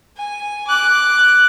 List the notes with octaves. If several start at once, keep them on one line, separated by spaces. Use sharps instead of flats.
G#5
D6 F#6